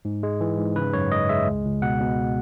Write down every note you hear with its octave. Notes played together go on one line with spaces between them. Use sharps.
G#2
G#3
E3
G#2
C#3 B4
F#2 C#5
G#3 D#5
G#3 E5
C#2
C#2
B2 F#5
B2